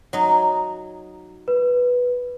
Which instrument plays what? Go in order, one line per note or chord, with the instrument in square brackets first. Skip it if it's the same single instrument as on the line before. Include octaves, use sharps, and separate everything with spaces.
[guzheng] F#3 D#4
[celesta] B4